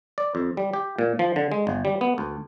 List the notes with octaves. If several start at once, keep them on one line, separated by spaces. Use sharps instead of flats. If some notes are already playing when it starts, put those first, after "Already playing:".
D5
F2
G3
G4
A#2
F3
D3
G#3
G1
G3
B3
D2